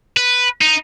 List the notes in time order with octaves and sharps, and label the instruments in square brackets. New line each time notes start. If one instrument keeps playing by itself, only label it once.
[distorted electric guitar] B4
D#4